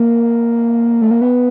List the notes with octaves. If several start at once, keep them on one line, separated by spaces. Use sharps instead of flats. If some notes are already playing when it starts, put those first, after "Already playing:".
Already playing: A#3
A3
A#3
B3